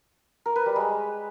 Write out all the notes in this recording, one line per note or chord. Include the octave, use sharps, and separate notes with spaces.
A#4
B4
G3
G#3